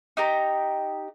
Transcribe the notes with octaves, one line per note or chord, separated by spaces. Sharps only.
D#4 G4 A#5